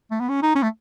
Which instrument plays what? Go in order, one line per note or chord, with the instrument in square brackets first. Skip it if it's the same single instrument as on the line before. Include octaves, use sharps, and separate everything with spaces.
[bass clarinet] A3
B3
C#4
D#4
C#4
A3